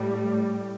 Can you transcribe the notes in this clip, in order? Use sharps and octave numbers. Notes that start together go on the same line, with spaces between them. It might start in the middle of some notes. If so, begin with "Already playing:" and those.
Already playing: A2 G3